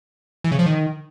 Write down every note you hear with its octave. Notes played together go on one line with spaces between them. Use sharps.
E3
C#3
F3
D#3